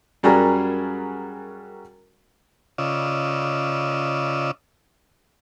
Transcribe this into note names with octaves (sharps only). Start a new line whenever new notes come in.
F#2 G3 F#4 G#4 A#4 A#5
C#3 F4 D5 D#5 E6